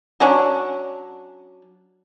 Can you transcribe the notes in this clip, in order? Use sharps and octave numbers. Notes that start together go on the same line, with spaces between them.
F#3 C#4 D4